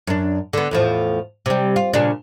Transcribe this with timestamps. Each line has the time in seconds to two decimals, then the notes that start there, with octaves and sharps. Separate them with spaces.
0.07 F#2 D4
0.53 D3 B3
0.71 E2 A2 F3
1.46 C3 G3
1.76 F4
1.94 A#2 C#3 D4